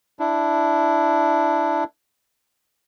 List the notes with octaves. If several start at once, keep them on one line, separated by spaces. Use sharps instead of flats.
D4 E4